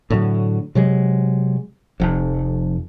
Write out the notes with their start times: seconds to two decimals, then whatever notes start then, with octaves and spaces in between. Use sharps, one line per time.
0.10 A2 D3 F#3
0.75 C3 F#3 G#3
2.00 F1 F2